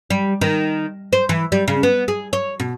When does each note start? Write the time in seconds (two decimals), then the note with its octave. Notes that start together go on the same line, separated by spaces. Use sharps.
0.10 G3
0.41 D#3
1.13 C5
1.29 E3
1.52 G3
1.68 C#3
1.83 B3
2.08 G#4
2.33 C#5
2.60 B2